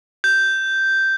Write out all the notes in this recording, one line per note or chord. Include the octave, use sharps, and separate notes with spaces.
G6